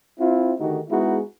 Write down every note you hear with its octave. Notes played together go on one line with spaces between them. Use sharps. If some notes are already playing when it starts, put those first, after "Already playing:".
C4 E4 F4
D3 D#3 A3 D#4 F#4 G4
G#3 B3 D#4 E4 F#4 G#4